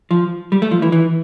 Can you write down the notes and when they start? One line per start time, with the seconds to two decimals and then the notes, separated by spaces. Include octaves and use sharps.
0.11 F3
0.52 G3
0.62 A3
0.71 F3
0.82 E3
0.92 E3